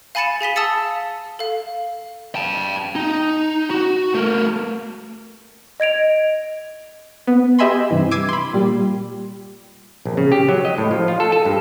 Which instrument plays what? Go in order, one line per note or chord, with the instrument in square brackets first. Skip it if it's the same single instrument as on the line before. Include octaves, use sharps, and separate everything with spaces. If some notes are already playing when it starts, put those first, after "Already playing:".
[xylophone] F5 G#5 B5 A6 C#7 E7
G#4 G#5 B6 G7
F5 A5 D#6 E6 A6 C#7
A4 F5
[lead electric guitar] G5 A5
D#4
F#4
A3 A#4
[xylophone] D#5 G#6 D7 F7
[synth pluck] B3
G4 D#5 E5 G#5 B5 C6
G2 C3 E3
D6 E6 G#6 C7 D#7
B5 C6
A#2 G3
[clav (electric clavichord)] A#1
C#3
G4
F#3
D#5
A2
F3
F4
A4
A4
G2